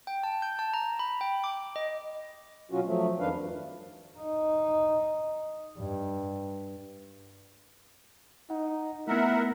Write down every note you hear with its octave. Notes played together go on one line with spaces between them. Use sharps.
G5
A5
G6
A5
A#5
B5
G5
D6
D#5
B2 F#3 C#4 F4 F#4
F3 F#3 A3
F2 D#3 F3 D4 B4 F5
G2
D#4
G2
D#4 F#5
A3 B3 E4 A#4 E5 F#5